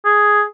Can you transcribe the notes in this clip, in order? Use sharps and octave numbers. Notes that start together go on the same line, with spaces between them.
G#4